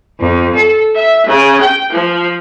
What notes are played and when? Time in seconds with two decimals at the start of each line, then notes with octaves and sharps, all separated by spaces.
0.19 F2
0.55 A4
0.94 E5
1.25 C#3
1.60 G5
1.91 F3